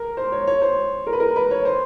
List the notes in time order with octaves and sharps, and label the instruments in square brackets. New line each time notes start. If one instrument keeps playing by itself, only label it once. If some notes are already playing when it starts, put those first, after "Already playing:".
Already playing: [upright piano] A#4
C5
C#5
C#5
C5
A#4
B4
A#4
B4
C#5
C5